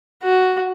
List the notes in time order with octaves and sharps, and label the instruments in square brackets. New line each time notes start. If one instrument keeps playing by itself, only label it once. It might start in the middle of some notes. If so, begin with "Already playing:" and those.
[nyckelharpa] F#4